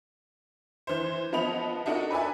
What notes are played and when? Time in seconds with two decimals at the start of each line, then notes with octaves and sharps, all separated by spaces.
0.87 E3 C5
1.32 F3 B3 D#5 B5 F7
1.86 D4 D#4 F#4 A4 A#4
2.10 B4 D5 E5 G#5